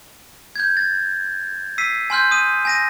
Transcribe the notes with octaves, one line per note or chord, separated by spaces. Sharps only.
G6 G#6
A6
E6 B6 C7 D#7
G#5 C6 F6 G6
D#6 D#7
G#5 A#6 D#7